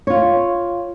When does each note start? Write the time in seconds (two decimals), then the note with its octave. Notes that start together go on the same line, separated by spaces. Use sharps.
0.07 F4 C#5